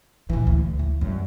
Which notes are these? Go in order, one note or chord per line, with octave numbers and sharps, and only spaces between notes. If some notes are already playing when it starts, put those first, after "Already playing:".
A#1 E3
D2
E3
F#2 G3